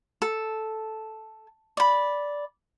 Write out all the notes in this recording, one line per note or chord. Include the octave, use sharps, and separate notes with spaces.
A4
D5 B5